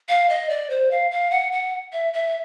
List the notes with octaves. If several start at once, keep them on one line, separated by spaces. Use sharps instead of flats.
F5
D#5
D5
C5
F5
F5
F#5
F#5
E5
E5